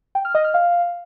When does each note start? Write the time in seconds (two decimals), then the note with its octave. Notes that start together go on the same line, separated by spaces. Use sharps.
0.15 G5
0.25 F6
0.35 D#5
0.44 F6
0.54 F5